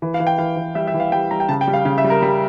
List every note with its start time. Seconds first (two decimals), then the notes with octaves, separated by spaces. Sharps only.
0.02 E3
0.14 F5
0.20 E3
0.27 G5
0.38 E3 F5
0.57 E3
0.75 G3 E5
0.87 E5
0.94 E3
1.00 F5
1.12 G3 G5
1.31 G3 A#5
1.40 G5
1.49 C#3 A5
1.61 G5
1.68 G3
1.73 F5
1.85 C#3 F5
1.98 E5
2.04 G3
2.10 A#4
2.22 G3